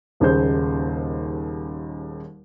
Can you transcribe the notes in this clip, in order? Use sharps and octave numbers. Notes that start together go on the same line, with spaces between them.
D#1 D#2 C#3 G#3 C5 G6